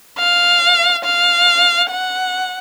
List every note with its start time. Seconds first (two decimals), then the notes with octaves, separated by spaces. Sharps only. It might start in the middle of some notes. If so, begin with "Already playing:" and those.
0.19 F5
1.05 F5
1.91 F#5